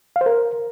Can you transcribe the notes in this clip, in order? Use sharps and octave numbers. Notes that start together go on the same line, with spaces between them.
F5
C5
A#4